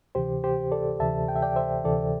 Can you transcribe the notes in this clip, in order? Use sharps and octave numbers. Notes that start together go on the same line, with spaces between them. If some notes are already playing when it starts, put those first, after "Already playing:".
D2 C3 E3 G4 C5
G4 C5
A4 D5
D2 C3 E3 E5 A5
G5
E5
D5 G5
C5 E5
D2 C3 E3 A4 D5